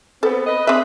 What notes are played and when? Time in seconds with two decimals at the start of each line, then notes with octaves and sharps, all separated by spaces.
0.23 B3 C4 A4
0.47 B4 D#5
0.67 C4 D4 G#4 B4 E5